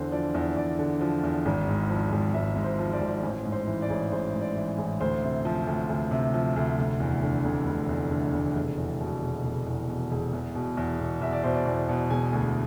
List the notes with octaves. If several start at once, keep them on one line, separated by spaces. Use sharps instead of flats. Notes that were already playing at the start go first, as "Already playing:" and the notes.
Already playing: E2 D3 C5
F3 D5
E2
E2 D5
D3
F3
E2
G#1
G#2
F3
G#1
G#1 E5
G#2
C5
F3
D5
G#1
A1 C5
G#2
C5
E3
D5
A1
A1 C5
G#2
D5
E3
A1
D2 C5
C3
F3
D2
D2
C3
F3
D2
F1
E2
D3
F1
F1
E2
D3
F1
E1
E2
B2
E1
E1
E2
B2
E1
E2
B2
E2
B2
E2 E5
D5
B2 C5
D5
E2
B2
E1 G#5
D2